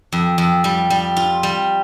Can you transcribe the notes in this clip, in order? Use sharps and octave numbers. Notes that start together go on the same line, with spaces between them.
F2
F2
G3
G3
F4
G3